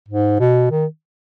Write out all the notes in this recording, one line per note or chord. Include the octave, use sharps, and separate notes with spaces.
G#2
B2
D#3